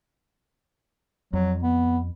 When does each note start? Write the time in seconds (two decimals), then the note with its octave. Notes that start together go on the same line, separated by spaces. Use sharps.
1.33 F2 F#3
1.63 B3